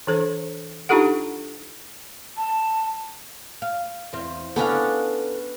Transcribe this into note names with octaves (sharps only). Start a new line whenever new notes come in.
E3 D4 A4 C5
D4 D#4 F4 G4 A4 F#5
A5
F5
E2 C4 F5
B3 C#4 D4 A4 F5